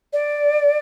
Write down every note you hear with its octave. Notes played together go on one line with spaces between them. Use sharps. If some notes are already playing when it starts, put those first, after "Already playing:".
D5